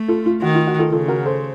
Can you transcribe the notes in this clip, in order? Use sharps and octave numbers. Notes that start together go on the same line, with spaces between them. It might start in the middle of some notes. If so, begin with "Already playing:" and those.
Already playing: A3
F4 A4
F4
D#3 F#4
F4
F#4
F4 A4
C#3 F4 A4
F#4 A#4
A4 C5